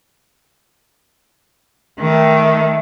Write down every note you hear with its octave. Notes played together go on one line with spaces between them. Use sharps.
D#3 A3